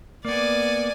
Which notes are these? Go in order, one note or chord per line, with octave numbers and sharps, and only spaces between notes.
A#3 B3 D5 G#5